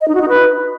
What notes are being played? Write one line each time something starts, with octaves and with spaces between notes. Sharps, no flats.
D#5
D#4
F#4
D#4
B4